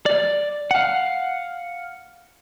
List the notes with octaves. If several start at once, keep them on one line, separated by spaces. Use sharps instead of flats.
D5
F5 F#5